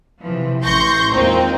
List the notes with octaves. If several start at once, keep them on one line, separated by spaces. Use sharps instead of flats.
C3 E3 F3
A1 E3 C6 C#6 G6 A#6
E2 A#2 D#3 G#3 C4 D#4